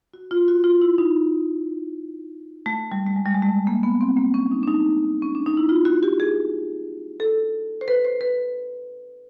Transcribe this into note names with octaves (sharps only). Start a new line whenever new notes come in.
F#4
F4
F#4
F4
E4
D#4
A3
G3
A3
G#3
G3
G#3
A3
A#3
B3
C4
A#3
C#4
D#4
D4
D#4
C#4
D4
D#4
E4
F4
F#4
G4
G#4
A4
C5
B4
C5
B4